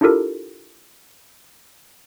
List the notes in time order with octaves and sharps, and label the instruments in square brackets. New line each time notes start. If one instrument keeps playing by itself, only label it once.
[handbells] D4 E4 F4 G4 A4 A#4